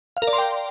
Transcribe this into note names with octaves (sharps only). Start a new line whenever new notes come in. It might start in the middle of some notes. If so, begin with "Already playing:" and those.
F5
A#4
D5
C6
G5